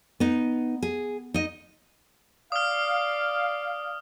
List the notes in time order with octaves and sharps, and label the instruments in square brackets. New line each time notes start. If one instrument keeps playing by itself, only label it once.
[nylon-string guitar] B3 D#4
G#4
D#4 D#5
[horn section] D5 F5 [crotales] D#6 F6